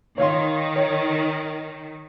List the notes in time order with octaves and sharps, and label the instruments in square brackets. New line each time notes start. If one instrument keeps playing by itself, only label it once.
[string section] D#3 [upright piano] C#5 F5 C6
[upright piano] C#5